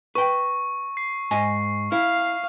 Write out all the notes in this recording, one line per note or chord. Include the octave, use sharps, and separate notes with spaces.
B4 G5 C#6
C7
G#2 D#5 G#5
E4 F5